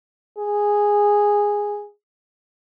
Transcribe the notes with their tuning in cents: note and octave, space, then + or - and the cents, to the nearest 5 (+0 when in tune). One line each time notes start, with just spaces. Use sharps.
G#4 -10